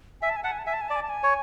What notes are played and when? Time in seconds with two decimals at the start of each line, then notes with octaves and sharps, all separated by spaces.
0.21 E5 G#5
0.29 A5
0.36 G#5
0.43 F#5 A5
0.52 G#5
0.59 A5
0.65 E5 G#5
0.73 A5
0.81 G#5
0.88 D5 A5
0.96 G#5
1.02 A5
1.09 G#5
1.24 C#5